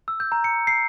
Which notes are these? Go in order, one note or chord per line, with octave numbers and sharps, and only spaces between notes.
E6
G6
A#5
C#7
C7